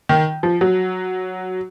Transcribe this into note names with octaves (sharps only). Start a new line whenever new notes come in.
D#3
F3
F#3